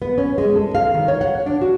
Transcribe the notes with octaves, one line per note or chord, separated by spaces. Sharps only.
B3
C#4
G#3
A4
F5
D#3
C#5
F#5
D4
F#4